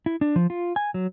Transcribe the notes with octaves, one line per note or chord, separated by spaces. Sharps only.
E4
D4
F3
F4
G#5
F#3